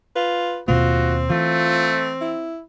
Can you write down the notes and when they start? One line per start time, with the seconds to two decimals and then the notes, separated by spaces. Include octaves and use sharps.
0.16 F4 B4
0.68 D#2 B2 A#3 C4 F4 F#4
1.30 E3 A3 F4
2.21 E4